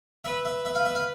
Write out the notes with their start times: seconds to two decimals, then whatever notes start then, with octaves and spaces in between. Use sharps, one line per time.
0.25 B4 E5
0.45 E5
0.65 E5
0.75 F5
0.85 E5
0.95 F5